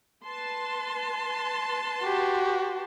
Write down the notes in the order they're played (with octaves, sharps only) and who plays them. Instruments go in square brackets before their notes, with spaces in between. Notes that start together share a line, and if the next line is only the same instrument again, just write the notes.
[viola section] B4 A5 C6
[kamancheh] F#4 G4